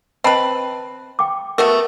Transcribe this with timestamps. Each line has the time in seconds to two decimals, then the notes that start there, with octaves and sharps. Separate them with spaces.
0.24 C4 B4 D#5 A5 B5
1.19 G5 D6
1.58 A3 B3 F#4 A#4